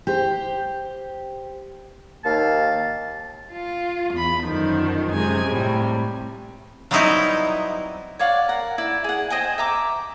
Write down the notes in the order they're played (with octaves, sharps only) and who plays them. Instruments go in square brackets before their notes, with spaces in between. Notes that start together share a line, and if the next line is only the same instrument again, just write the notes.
[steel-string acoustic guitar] G4 C5
[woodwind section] D#2 D#3 A#3 F5 A5
[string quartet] F4
E2 B5
F#2 D3 D#3 F3
F#2 C3 G#3 G#5
A2 C3 G3
[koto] F#3 G3 B3 C4 D#4 E4
[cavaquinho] C#5 D5 F5 F#5
A#4 F#5
E4 D5
G#4 F#5
C5 D#5 G5 G#5
E5 A#5 D6